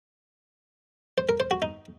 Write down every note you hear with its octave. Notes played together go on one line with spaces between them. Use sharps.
C5
A#4
C5
F#4
D#4